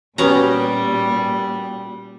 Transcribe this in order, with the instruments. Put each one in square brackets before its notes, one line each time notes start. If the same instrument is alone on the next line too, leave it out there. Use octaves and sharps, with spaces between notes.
[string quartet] A#2 G3 [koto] B3 C#4 A#5 [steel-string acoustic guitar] F#4 G4